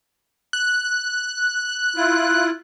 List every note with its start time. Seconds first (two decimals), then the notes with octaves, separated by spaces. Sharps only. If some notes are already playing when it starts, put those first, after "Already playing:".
0.53 F#6
1.96 E4 F4